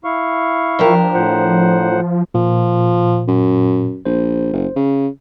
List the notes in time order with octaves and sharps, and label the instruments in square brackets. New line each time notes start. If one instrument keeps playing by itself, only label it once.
[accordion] E4 F5 C#6
[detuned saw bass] F3 [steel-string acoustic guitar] D4 G4 A#4
[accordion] A2 C5 F#5
[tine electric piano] A#2 [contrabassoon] F3
[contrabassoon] F#2
[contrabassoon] A#1 [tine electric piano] C5
[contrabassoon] F#1
C#3